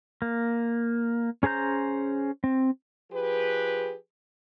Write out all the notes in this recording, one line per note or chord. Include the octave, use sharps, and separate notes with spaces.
A#3
C#4 G#4 C5 A#5 G6
C4
F3 G4 G#4 B4